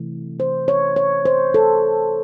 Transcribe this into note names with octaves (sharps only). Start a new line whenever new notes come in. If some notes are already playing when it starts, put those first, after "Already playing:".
Already playing: C3 E3 A3
C5
C#5
C#5
C5
A4